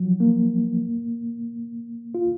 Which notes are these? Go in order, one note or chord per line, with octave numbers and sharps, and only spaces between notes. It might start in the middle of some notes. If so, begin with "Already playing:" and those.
Already playing: F3 F#3
A#3
F4